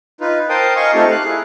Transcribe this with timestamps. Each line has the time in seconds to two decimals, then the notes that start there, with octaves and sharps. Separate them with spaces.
0.21 D#4 F4 B4
0.49 A#4 C5 F5 G5 A5 D#6
0.76 D#5 F5 G#5 C#6 D#6
0.94 A3 C4 D#4 F4 G4 A4
1.11 F5 F#6
1.25 E4 G#4